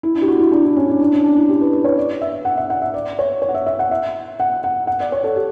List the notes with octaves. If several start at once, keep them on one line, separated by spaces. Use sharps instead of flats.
E4
D4
G4
F#4
E4
D4
E4
C#4
D4
D4
C#4
D4
E4
G4
B4
B4
C#5
D5
E5
F#5
E5
F#5
E5
D5
C#5
C#5
F#5
E5
E5
F#5
E5
F#5
F#5
F#5
D5
C#5
A4
G4